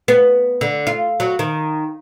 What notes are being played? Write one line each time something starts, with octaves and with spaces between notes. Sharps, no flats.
B3
D3
F4
F#3
D#3